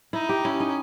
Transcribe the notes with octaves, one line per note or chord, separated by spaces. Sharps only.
D#4 E4
G4
C#4 E4
D#4